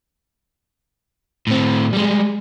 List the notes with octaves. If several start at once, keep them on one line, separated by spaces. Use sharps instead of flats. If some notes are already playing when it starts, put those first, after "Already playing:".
A2 C4
G3 G#3